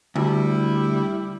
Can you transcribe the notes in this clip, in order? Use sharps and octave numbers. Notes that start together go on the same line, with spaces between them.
D2 G3 E4